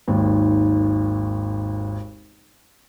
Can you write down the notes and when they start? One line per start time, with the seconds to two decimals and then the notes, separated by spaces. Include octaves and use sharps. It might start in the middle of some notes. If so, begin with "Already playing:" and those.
0.08 G#1 D#2